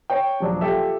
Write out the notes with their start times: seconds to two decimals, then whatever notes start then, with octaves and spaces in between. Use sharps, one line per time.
0.10 C#5 G5
0.40 D#1 F3 F#3 D4
0.61 F4 G4 A4 E5